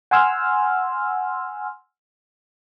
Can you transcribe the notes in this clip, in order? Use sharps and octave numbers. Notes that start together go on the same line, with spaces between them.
F#5 G#5 C6 E6 F6